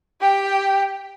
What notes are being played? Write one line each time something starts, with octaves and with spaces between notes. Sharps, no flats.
G4 G5